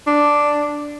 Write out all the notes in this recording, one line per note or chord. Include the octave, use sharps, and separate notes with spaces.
D4